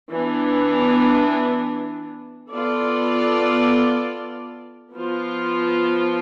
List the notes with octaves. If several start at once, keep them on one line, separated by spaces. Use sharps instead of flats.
E3 B3 D4
B3 F4 A4 D5
F3 B3 F4